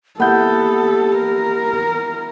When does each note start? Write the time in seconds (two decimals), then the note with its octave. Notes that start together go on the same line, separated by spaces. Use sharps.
0.20 A#3 B3 E4 G4 A4 F#5 G6
1.18 A#4